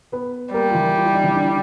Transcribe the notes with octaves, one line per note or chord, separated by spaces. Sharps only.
B3 B4
G3 A#3 A#4
F4
E3 E4
F4
E4
D#4
E3 E4
D#4
D3 D4